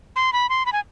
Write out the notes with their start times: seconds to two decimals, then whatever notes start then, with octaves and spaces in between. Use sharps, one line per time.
0.16 C6
0.33 B5
0.49 C6
0.66 B5
0.73 G#5